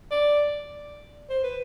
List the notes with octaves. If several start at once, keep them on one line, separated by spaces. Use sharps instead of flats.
D5
C5
B4